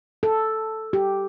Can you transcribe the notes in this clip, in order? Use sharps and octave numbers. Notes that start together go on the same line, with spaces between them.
A4
G4